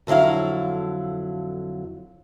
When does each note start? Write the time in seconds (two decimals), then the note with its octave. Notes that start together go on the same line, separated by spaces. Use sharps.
0.07 F2 D3 F#3 E4 F5